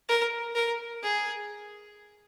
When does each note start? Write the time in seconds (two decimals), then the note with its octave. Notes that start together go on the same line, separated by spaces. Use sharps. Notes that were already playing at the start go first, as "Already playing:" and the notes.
0.09 A#4
0.55 A#4
1.03 G#4